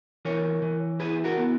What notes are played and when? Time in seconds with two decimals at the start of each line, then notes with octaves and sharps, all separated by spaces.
0.25 E3 A#4 C#5
0.62 E3
1.00 E4 G#4 B4
1.24 F#4 A#4
1.37 B3